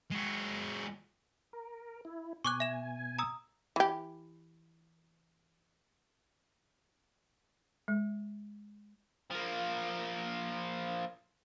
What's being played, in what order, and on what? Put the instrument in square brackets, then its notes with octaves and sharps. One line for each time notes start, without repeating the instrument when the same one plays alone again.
[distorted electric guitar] G#3 F#4
[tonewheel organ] A#4
E4
[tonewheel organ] B2 G#5 [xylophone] C#6 D6 F#6
[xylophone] E5 E7
A#5 D#6 E6
[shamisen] E3 G4
[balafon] G#3
[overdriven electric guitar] F3 A#3